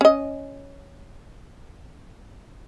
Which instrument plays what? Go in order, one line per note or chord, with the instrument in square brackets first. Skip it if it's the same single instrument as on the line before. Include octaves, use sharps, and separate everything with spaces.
[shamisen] C#4 D#5